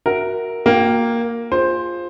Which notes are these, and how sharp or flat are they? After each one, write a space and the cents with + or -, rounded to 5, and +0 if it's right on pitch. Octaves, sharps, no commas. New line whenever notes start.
F#4 +0 A#4 +0 E5 +0
A#3 +0 F#4 -40 G5 +0
F4 +5 G#4 -15 C5 +10